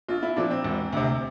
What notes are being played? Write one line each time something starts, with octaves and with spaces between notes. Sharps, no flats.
A#1 F4
E4
A#2 F3 D4
C4
E1
D2 C3